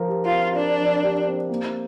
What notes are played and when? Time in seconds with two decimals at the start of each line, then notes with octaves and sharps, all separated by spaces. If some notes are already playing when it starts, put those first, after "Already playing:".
Already playing: F3 A#4
0.08 G4
0.25 F4
0.32 C4
0.55 D4 A#4
0.79 F3
1.03 G4
1.27 C4
1.49 A#3